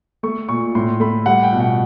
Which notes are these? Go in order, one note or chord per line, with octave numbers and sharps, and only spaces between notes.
A3 C#6
A#2 C#6
A2 C6
A3 B5
G3 F#5
G5
B2
F#5